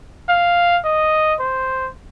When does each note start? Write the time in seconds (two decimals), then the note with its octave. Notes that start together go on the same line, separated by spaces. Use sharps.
0.29 F5
0.85 D#5
1.40 C5